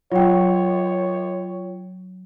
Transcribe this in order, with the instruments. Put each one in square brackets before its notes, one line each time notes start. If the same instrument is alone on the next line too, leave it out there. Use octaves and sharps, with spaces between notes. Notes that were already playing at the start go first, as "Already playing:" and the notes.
[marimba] F#3 [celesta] F4 G5 [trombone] C#5